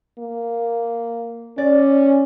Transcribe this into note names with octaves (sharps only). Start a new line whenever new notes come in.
A#3
C#4 D5